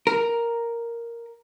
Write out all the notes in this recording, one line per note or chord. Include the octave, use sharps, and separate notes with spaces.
A#4